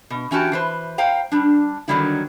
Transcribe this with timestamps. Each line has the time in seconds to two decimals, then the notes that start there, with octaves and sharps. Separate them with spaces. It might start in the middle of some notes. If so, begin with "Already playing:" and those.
0.10 B2
0.31 E3 C#4 F#4 G4 A5
0.52 E3 B4 C5
0.98 C5 F5 G5 A#5
1.32 G3 D4
1.88 D3 D#3 F#3 G3 A#3 E4